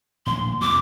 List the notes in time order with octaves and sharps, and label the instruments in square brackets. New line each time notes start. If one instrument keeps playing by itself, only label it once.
[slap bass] D#1 A#1 A2 [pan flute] C6
[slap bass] E2 C3 [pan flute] D6